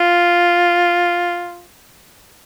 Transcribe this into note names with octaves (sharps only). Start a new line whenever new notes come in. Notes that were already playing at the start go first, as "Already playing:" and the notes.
Already playing: F4